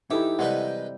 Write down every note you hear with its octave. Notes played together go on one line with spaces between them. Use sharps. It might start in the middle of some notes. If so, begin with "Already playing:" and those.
E3 D#4 E4 G4 A4 E5
C3 G3 G#3 D#4 B4 F#5
G5